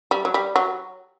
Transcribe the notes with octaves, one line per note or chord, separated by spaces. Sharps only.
G3
F#3
G3
F#3